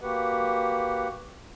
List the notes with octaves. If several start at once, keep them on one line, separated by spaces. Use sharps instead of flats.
A#3 F#4 G4 B4 F#5